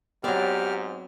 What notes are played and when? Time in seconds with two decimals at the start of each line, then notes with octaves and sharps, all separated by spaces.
0.24 G#2 F#3 B3 C4 G4 D5 E5 F6